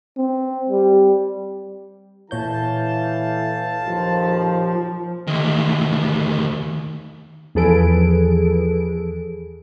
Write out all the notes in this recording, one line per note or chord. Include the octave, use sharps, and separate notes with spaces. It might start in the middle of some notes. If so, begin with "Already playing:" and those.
C4
G3
A#2 E3 A4 C#5 F5 A5 G6
D#2 F3
D2 D#3
E2 F3 G#4 A4 B4 D7